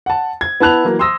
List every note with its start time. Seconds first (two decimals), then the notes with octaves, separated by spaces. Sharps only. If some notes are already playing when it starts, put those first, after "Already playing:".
0.06 F#5 A5
0.41 G#6
0.60 B3 E4 A5 F#6 F7
0.84 E3 F#3 A#3
0.99 C6 D#6 E6 A#6